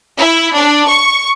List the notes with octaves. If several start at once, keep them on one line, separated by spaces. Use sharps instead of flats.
E4
D4
C#6